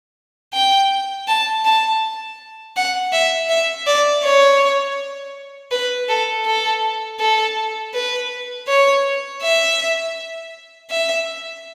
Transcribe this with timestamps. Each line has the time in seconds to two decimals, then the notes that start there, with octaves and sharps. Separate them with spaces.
0.53 G5
1.28 A5
1.65 A5
2.76 F#5
3.12 E5
3.49 E5
3.87 D5
4.23 C#5
5.71 B4
6.09 A4
6.46 A4
7.20 A4
7.94 B4
8.68 C#5
9.42 E5
10.90 E5